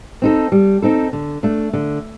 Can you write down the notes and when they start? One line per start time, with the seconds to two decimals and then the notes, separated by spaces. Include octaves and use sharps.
0.22 C4 D#4 A4
0.52 G3
0.82 C4 D#4 A4
1.13 D3
1.43 A3 D4
1.73 D3